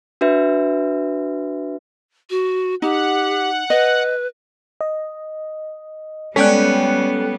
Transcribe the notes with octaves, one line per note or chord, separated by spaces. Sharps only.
D4 F#4 B4 E5
F#4
D#4 G4 F#5
B4 D#5
D#5
G3 G#3 B3 C#4 A4 D5 G5 F#6